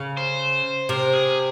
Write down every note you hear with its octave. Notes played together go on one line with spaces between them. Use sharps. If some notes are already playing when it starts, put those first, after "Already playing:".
Already playing: C#3
C5
C3 A#4
G#4